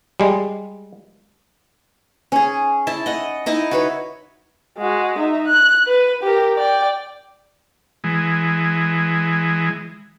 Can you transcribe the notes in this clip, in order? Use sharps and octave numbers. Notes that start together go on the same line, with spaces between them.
G3 G#3
C#4 G#4
E4 A5
D#5 F#5
D#4 E4 D#5
F#4 B4 C#5
G#3 F#4
D#4 E5
F#6
B4
G4 A#4
D5 G5
E3 G#3